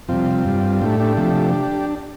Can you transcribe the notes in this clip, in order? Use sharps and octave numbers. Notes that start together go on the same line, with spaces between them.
F2 C3 G3 C4 F4
G2 G3
A2 A3 D4 G4
D4 G4
C3 F3 A3